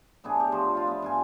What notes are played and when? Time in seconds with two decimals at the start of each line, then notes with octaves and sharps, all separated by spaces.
0.24 A2 B3 D4 G#4
0.40 G4
0.52 F3 F4 F#4 C5
0.75 F4 F5
0.87 B3 E5
1.02 G2 F4 G#5